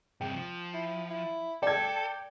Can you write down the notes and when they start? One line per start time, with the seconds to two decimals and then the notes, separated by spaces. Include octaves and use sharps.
0.21 G2 C3 G5
0.36 F3
0.74 E4
1.10 E4
1.63 A4 D5 G5 G#6